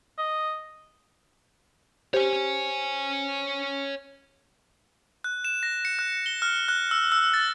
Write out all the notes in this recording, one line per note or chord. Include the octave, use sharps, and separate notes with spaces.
D#5
G4 C5 C#5 G#5
F#6
E7
A#6
C#7
F#6
G7
F6
F#6
E6
E6
A6